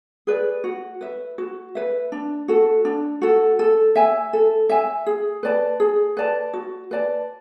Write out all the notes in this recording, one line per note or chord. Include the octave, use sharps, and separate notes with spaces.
G#4 B4 D5
F#4
B4 E5
F#4
B4 E5
D4
F#4 A4
D4
F#4 A4
A4
E5 G#5
A4
E5 G#5
G#4
B4 D5 A5
G#4
B4 D5 A5
F#4
B4 D5 A5